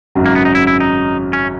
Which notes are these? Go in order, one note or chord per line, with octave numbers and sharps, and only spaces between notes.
G#1 F#2 C#3 F#3
A#3
B3
D#4
E4
E4
D#4
C#4